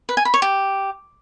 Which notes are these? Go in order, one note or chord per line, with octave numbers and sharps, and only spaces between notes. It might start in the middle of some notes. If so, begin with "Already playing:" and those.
B4
G#5
B5
C#5
G4